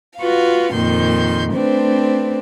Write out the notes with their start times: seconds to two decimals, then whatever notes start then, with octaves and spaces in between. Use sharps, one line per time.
0.19 F4 F#4 B4 F5
0.74 F2 A#2 D#3 C6 G6
1.54 A3 C4 D4 B4 C5